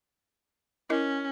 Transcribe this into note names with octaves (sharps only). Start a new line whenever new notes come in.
C#4 E4 A#4 D#5